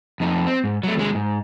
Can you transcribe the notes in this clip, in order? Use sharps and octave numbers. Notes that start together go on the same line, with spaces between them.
F2 D#4
C4
G#2
F#3 A3
D#2 G#3
G#2